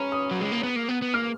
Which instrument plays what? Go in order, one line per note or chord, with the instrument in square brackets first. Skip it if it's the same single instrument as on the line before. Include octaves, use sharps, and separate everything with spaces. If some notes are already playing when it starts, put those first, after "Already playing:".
Already playing: [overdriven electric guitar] C#4 [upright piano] A#5 B5
[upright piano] D#6
[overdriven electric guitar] F#3
G#3
A#3
B3
A#3
B3
B3
[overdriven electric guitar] A#3 [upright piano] F6